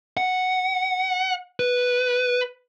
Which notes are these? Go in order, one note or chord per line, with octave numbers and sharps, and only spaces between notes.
F#5
B4